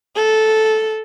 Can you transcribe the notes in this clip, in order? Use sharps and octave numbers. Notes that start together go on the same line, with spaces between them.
A4